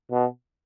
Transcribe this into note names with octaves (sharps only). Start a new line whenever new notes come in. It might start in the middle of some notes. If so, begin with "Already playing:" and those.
B2